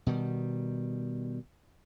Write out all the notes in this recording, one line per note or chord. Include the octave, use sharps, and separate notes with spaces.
B2 D#3 G3